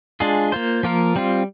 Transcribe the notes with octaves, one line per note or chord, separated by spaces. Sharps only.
G#3 D4 F4 G#4
A#3 F4 C5
F3 A#3 F4 A#4
G3 C4 F4